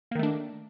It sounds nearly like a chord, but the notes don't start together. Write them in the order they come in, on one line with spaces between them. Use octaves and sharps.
A#3 D#3 A3 D4